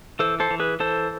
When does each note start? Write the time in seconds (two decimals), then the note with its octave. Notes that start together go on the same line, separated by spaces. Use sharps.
0.19 E3 A4 C5
0.40 A4 C5
0.51 E3
0.60 G#4 B4
0.80 E3 A4 C5